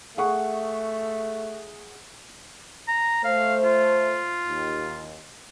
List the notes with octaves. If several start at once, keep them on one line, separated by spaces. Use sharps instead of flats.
A3 G#4 F#5 C#6
A#5
A3 C5 F5
F4
D#2